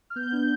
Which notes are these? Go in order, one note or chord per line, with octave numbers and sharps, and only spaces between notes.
F6
B3 G6
D4